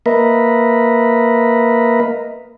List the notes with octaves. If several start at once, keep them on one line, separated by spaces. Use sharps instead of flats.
A#3 A#4 B4 D#5 E5